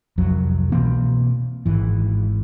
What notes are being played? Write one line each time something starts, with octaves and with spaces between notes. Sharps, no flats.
C2 F2 F#3
B2 E3 A#3 C4
G#1 E3